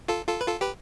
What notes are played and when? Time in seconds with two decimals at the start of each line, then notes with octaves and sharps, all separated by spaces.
0.08 F4 A4
0.27 F4 A4
0.41 B4
0.47 F4 A4
0.61 G4 B4